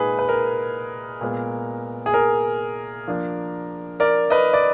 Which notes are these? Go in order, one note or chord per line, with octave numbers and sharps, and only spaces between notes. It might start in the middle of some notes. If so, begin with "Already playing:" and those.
Already playing: A#2 G#3 D#4 G#4 B4
B4
A#4
A#2 G#3 B3
G#4
A#4
F3 A#3 D4
A#4 D5
B4 D#5
D5